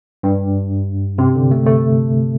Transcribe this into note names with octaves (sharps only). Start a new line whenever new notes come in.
G2
C3
D3
A3
A3